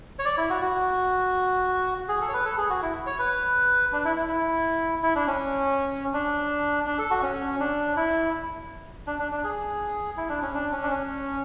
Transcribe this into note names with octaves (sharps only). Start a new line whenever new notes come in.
C#5
D5
E4
F#4
F#4
G#4
A4
C#5
B4
A4
G#4
F#4
E4
C#5
B4
D4
E4
E4
E4
E4
D4
C#4
D4
D4
A4
F#4
C#4
D4
E4
D4
D4
D4
G#4
E4
D4
C#4
D4
C#4
D4
C#4